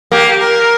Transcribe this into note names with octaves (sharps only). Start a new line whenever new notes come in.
A#3 G4
A#4